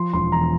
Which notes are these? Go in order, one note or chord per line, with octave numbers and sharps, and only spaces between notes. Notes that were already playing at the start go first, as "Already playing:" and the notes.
Already playing: F3 C6
E1 C6
E2 A#5